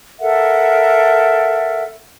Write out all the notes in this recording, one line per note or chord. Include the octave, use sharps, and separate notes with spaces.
A4 A#4 E5 F#5